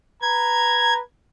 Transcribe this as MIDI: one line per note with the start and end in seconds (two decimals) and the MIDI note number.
0.22 0.99 71
0.22 0.99 82
0.22 0.93 92